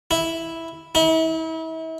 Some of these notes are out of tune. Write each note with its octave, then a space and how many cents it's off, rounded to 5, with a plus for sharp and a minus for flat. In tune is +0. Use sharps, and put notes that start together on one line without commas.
E4 -5
E4 -40